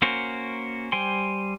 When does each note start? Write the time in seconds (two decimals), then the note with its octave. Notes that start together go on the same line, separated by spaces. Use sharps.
0.02 A#3 C#4 F#4 A#4 C5
0.92 G3 C5 G5 G#5 C6